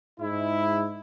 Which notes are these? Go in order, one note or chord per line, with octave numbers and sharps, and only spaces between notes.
G#2 G#3 E4